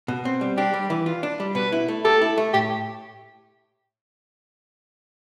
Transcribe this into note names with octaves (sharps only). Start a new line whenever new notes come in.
B2
C4
G3
D4 G4
G3
E3
F4
D4
G3
B2 B4
E4
A3
G4 A4
E4
A3
A2 G4